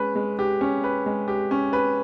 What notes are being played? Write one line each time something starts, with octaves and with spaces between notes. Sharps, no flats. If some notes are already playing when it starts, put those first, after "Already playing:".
Already playing: G#3 C#4 B4
G#3
G4
C#4
B4
G#3
G4
C#4
B4